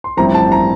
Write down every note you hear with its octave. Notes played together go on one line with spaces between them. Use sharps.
C6
A1 G2 F3 C4 E4 A#5
A5
A#5